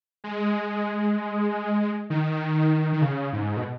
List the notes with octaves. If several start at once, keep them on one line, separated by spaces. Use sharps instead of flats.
G#3
D#3
D#3
C#3
G#2
B2